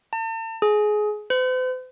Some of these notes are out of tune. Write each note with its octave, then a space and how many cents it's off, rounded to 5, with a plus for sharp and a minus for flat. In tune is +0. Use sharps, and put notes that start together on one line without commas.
A5 +40
G#4 +20
C5 -45